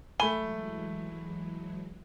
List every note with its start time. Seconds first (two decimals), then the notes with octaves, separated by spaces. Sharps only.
0.20 E3 F#3 G#3 A3 G#5 B5 G7